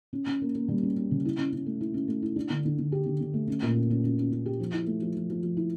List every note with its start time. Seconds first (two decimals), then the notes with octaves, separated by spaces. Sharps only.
0.13 C#4
0.27 C#4
0.42 A#3
0.55 A#3
0.68 G3
0.83 C#4
0.96 C#4
1.11 C#3
1.25 E4
1.38 C#4
1.53 C#4
1.66 A3
1.81 E4
1.94 C#4
2.08 A3
2.22 E4
2.36 D4
2.50 D3
2.65 D3
2.79 D3
2.92 G4
3.06 D3
3.21 D3
3.34 A3
3.48 C#4
3.62 A#2
3.76 C#4
3.90 C#4
4.04 C#4
4.18 C#4
4.32 C#4
4.46 G4
4.60 F3
4.73 E4
4.87 A3
5.02 F3
5.15 F3
5.30 F3
5.43 F3
5.57 E4